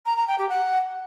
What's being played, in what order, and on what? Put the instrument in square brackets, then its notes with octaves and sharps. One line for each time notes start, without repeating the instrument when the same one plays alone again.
[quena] A#5
A#5
G5
G4
F#5